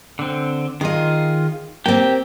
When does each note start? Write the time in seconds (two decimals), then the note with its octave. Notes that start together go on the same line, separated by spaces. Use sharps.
0.19 D3 C4
0.81 D#3 F4 G#4 D#5
1.86 A#3 C4 G4 G5